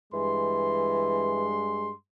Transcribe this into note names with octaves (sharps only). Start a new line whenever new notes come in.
G2 E3 G#3 C6